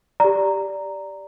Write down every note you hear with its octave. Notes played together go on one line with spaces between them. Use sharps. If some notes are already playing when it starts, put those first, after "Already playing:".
G4 D5 A#5